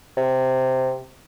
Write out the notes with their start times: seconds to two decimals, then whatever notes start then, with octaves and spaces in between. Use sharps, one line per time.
0.17 C3